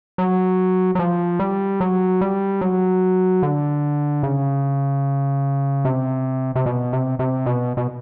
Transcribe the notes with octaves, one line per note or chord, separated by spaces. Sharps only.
F#3
F#3
F3
G3
F#3
G3
F#3
D3
C#3
C3
C3
B2
C3
C3
B2
B2